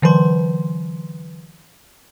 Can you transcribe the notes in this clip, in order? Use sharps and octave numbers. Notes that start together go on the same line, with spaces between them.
D3 E3 F#3 B4 C6